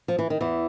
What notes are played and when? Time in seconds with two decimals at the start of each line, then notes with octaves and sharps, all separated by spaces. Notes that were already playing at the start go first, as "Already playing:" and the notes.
0.08 F3
0.19 E3
0.30 D#3
0.41 E2 E3